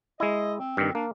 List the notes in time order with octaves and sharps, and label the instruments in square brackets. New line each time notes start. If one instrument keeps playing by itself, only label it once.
[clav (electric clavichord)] G#3 E4 [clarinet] D#5
[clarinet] C4
[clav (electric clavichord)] G2 D#3
[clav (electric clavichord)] A#3 [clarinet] D4